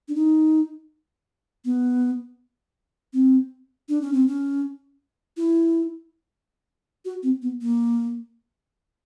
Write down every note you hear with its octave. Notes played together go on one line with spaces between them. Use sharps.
D4
D#4
B3
C4
D4
C#4
C4
C#4
E4
F#4
C4
B3
A#3